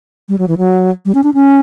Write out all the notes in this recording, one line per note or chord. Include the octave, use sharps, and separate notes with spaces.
G3
F#3
E3
F#3
G3
C#4
D4
C#4